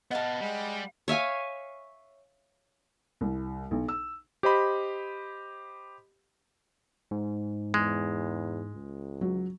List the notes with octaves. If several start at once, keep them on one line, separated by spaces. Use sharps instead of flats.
B3 B4 D#5 F5 F#5 A5
G3 G#3
C#5 E5 F5 G#5
C2
B1
E6
G4 C5 D#5 B5
G#2
E2 G#3
C#2
F#3